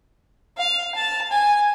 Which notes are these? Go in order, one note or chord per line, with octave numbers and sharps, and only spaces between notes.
F5
A5
G#5